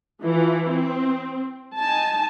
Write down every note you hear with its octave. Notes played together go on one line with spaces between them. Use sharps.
E3 F3
C4
D#4 G#5 A5